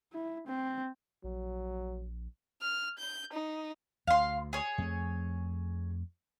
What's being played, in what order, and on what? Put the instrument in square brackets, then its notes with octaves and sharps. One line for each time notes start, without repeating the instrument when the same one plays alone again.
[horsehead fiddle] E4
C4
[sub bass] A#1 [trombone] F#3
[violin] F6
G6
D#4
[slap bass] D2 [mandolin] F5 C6
[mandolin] G#4 C#5
[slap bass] F2 A3